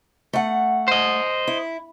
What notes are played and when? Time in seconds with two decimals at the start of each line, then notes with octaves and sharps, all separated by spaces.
0.33 A3 F#5
0.88 C5 D#5
1.47 E4